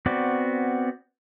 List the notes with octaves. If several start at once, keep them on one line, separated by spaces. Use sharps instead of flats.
B3 C4 F#4 D5